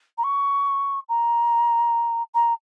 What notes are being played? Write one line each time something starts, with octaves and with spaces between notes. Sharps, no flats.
A#5
C#6
A#5
A#5